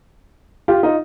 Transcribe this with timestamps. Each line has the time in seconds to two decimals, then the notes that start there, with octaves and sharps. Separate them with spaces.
0.68 F4 G4
0.83 D#4 F4